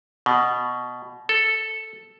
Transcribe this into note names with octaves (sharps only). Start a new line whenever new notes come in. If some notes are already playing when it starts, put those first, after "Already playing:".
B2
A4